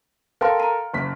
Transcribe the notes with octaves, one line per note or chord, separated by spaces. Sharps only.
A4 A#4 F5 G5 C6
A#5
F#1 B6